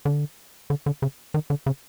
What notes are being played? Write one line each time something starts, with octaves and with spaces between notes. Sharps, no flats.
D3
D3
D3
C#3
D#3
D3
C#3